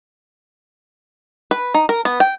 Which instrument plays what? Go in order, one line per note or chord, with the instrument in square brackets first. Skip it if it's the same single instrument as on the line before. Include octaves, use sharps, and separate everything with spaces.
[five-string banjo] B4
D#4
A#4
B3
G5